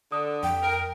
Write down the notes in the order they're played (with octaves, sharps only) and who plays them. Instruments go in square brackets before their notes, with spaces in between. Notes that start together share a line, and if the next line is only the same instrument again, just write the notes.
[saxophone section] D3 [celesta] D#6
[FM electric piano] F2 [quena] G5
[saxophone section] A#4